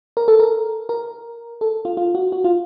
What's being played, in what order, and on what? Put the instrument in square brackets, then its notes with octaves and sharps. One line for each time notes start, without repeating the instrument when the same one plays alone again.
[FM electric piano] A#4
A4
A#4
A#4
A4
F4
F4
F#4
F#4
F4